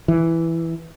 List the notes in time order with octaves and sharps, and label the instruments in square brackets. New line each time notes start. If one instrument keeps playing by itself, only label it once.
[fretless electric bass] E3